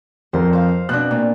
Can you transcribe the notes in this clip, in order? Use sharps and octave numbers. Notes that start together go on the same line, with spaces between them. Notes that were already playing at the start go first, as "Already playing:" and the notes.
F2 A#4 C5
C5 F5
B2 C4 D4 F#6
A#2